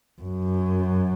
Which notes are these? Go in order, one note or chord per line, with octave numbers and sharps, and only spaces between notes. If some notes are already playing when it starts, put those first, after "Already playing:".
F#2